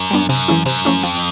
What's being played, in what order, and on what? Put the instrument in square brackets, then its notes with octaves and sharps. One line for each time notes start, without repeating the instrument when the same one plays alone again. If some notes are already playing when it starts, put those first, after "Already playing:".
Already playing: [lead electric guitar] F#2
[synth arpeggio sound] G3 B3 D4
[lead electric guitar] F#2 [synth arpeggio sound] C3
[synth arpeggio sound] E3 G#3 C#4 E4
[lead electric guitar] F#2 [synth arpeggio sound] C3
[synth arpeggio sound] F3 A3 C#4 E4
[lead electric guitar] F2 [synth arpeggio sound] F3